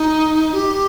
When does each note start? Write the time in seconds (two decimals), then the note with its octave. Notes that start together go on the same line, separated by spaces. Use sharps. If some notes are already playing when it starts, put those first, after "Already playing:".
Already playing: D#4
0.53 G4